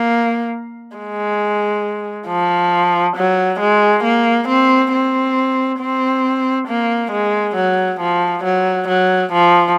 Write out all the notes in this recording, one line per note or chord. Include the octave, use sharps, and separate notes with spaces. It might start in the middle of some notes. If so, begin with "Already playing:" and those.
Already playing: A#3
G#3
F3
F#3
G#3
A#3
C4
C4
C4
A#3
G#3
F#3
F3
F#3
F#3
F3